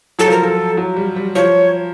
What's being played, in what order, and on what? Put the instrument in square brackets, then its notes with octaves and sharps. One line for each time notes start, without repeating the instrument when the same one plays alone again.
[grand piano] F#3 [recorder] A4
[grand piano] F3
[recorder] A#4
[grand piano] F3 [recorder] A4
[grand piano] F#3
G3
G3
[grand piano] F3 [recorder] C#5